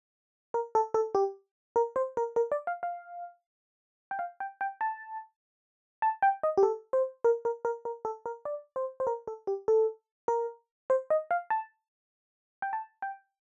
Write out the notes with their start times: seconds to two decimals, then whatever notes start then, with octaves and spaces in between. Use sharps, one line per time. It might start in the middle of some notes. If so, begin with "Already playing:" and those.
0.54 A#4
0.75 A4
0.94 A4
1.15 G4
1.76 A#4
1.96 C5
2.17 A#4
2.36 A#4
2.52 D5
2.67 F5
2.83 F5
4.11 G5
4.19 F5
4.40 G5
4.61 G5
4.81 A5
6.02 A5
6.22 G5
6.43 D#5
6.57 G4
6.63 A4
6.93 C5
7.24 A#4
7.45 A#4
7.65 A#4
7.85 A#4
8.05 A4
8.26 A#4
8.45 D5
8.76 C5
9.00 C5
9.07 A#4
9.27 A4
9.47 G4
9.68 A4
10.28 A#4
10.90 C5
11.10 D#5
11.31 F5
11.50 A5
12.62 G5
12.73 A5
13.02 G5